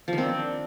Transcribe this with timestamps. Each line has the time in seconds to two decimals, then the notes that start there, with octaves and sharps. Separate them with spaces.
0.08 F3
0.13 D#3
0.18 C4
0.23 D4